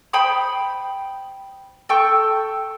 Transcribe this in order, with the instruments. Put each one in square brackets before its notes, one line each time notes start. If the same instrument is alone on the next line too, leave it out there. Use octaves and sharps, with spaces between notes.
[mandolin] C5 G5 B5 D#6
A4 G5 C#6